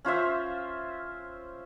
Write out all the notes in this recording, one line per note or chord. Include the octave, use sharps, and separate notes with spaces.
C#4 F4 C5 E5